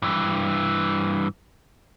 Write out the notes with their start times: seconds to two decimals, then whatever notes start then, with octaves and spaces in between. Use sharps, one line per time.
0.02 G2 E3